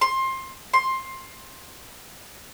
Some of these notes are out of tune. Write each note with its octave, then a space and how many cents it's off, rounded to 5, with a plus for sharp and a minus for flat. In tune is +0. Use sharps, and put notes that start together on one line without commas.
C6 +20
C6 +15